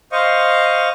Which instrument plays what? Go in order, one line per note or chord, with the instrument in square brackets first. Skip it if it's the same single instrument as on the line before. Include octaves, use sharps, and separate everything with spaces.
[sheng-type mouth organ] C5 D#5 F5 C#6